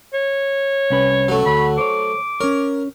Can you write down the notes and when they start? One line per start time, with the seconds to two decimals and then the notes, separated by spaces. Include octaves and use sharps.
0.14 C#5
0.90 C2 C#4 B4
1.28 F#3 A3
1.46 D2 F#4 B5
1.78 C5 C#5 D6
2.41 C#4 A#4 C#5